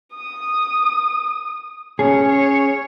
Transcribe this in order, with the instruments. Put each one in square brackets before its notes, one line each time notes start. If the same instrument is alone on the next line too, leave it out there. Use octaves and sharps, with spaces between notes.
[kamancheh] D#6
[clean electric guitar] C#4 G#4 [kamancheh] C#5
[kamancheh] C#5